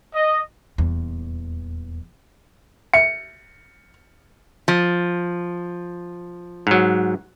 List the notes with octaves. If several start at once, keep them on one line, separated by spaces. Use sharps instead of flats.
D#5
D#1 E2
E5 C#7
F3
G#2 F#3